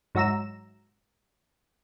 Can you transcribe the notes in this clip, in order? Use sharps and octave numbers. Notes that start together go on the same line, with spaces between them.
G#2 F#3 F#4 E5 A#5 E7